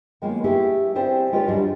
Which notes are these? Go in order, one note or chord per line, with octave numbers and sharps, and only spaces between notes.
D#3 F#3 G#3 A#3 B3 F4
D3 A3 E4 G4 G#4 B4
C4 E4 G4 G#4 C5 D5
G#3 F4 G4 B4 C#5
D2 G#2 F#3 G3 D4 D5